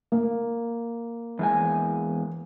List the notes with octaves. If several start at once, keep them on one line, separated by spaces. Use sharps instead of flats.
A#3
E2 G#3 G#5